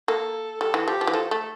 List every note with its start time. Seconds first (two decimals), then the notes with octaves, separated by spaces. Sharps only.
0.08 A#3 A4
0.61 G3 A4
0.74 E3
0.87 F3 G4
1.01 F3
1.07 E3
1.13 F3 A4
1.31 A3 A4